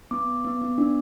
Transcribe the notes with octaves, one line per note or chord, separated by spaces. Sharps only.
B3 D6
B3
B3
B3
D4